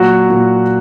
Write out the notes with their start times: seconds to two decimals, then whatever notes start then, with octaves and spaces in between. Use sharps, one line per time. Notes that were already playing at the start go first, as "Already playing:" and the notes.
Already playing: A#2 F#3 F#4
0.30 A#2